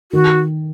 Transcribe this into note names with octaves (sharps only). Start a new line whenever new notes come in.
D#3 F#4